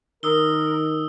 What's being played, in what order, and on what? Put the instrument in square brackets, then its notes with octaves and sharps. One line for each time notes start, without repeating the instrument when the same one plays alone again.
[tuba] D#3 [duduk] A#4 [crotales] D#6 E6 G7